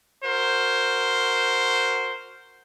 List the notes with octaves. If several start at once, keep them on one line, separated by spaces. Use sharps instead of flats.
F#4 A#4 C5